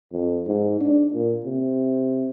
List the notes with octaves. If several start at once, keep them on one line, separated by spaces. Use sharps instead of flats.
F2
G#2
D4
A#2
C3